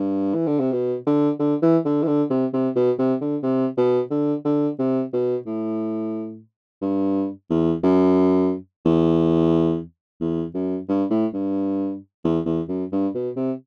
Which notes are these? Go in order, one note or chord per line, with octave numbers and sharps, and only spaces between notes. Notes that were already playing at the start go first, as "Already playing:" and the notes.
Already playing: G2
E3
D3
C3
B2
D3
D3
E3
D3
E3
D3
C3
C3
B2
C3
D3
C3
B2
D3
D3
C3
B2
A2
G2
E2
F#2
E2
E2
F#2
G2
A2
G2
E2
E2
F#2
G2
B2
C3